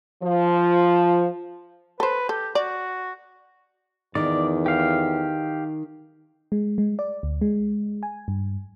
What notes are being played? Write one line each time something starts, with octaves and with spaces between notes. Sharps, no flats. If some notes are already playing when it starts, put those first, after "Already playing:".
F3
A4 B4 C5
G4 A4
F#4 D5
E2 D#3 D5
G4 F5
G#3
G#3
D5
D2
G#3
G#5
G2